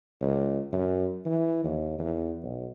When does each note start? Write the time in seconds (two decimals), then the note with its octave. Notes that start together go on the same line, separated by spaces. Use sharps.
0.21 C#2
0.72 F#2
1.25 E3
1.64 D#2
1.98 E2
2.43 B1